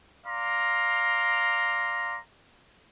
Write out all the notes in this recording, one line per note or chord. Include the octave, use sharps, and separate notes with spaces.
D5 F5 A#5 C6